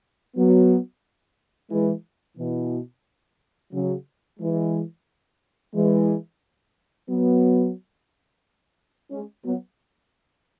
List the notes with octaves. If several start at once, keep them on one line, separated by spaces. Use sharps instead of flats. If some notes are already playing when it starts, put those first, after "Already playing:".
F#3 B3
E3 G#3
B2 E3
C#3 F#3
E3 G#3
E3 G#3
F#3 B3
G#3 C#4
F#3 B3